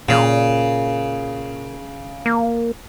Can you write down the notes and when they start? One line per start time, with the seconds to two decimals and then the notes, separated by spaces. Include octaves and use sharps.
0.09 A#2 C#3
2.26 A#3